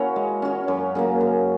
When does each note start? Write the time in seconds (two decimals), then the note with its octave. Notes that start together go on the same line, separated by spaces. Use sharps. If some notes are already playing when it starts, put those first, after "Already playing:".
Already playing: A#3 C#4 E4 F#4 C#5
0.16 G#3
0.42 C#4 F#4 C#5
0.68 F#2
0.95 C#3 F#3 A#3
1.21 F#2